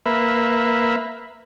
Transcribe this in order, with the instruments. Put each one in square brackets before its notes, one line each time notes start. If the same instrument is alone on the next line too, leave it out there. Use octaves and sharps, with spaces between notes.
[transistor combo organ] A#3 B4 E5